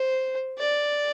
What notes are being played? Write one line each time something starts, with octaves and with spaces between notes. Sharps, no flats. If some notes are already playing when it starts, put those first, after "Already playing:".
Already playing: C5
D5